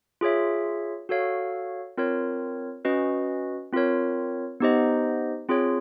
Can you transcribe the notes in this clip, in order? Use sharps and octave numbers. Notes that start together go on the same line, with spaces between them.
F4 G#4 C#5 E5
F#4 A4 C#5 F5
C4 F4 A#4 C#5
C#4 F#4 B4 D#5
C4 F4 A#4 C#5
B3 D#4 G4 C5 D#5
C4 F4 G#4 C#5